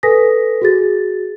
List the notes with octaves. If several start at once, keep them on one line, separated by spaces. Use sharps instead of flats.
A4 B4 G#5 D#6 A#6 B6
F#4 G#4 A6